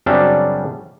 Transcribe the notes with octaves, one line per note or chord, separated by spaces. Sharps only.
F#2 C#3 G3 C4 D4